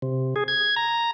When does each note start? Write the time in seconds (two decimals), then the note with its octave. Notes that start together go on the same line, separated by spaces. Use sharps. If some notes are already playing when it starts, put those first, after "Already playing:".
0.02 C3
0.36 G#4
0.48 G#6
0.76 A#5